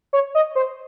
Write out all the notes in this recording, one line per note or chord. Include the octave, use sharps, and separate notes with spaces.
C#5
D#5
C5